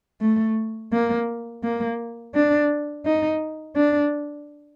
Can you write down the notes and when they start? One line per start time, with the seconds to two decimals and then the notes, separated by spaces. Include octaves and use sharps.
0.21 A3
0.92 A#3
1.63 A#3
2.35 D4
3.06 D#4
3.76 D4